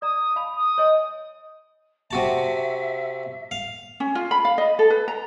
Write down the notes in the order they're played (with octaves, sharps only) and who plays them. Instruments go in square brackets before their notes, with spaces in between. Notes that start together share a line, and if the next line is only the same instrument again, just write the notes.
[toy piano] D5 A#5 [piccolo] D#6
[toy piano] F5 A5 B5
[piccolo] D#6
[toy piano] C#5 D#5 G#5
[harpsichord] C3 F#4 A5 [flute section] E5
[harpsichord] F5
[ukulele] C#4
F4
B5
F5
D#5
A4
B4
A#5